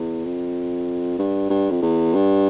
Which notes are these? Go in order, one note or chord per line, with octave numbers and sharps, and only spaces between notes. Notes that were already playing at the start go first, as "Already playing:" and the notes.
Already playing: E2
F2
G2
G2
F2
E2
G2